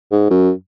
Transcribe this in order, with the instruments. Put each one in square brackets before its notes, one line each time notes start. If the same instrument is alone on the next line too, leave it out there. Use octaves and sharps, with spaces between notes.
[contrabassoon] G#2
F#2